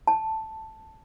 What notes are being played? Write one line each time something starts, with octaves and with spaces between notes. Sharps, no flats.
A5